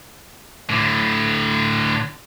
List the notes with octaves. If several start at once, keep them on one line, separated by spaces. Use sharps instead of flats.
A2 D3